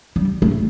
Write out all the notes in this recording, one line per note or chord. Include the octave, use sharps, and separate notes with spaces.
G3
A3